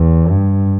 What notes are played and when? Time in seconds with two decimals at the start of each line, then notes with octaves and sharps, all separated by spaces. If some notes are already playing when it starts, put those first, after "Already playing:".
Already playing: E2
0.29 G2